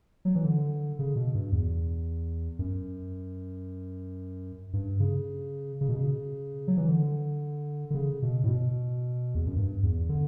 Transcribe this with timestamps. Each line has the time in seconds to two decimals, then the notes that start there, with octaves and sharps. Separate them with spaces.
0.25 F#3
0.35 E3
0.44 D3
0.99 C#3
1.16 B2
1.34 G2
1.52 E2
2.59 F#2
4.73 G2
5.00 C#3
5.81 C#3
5.89 B2
5.95 C#3
6.68 F#3
6.77 E3
6.88 D3
7.90 D3
7.95 C#3
8.22 B2
8.44 A2
8.49 B2
9.35 E2
9.46 F#2
9.56 G2
9.83 E2
10.09 D3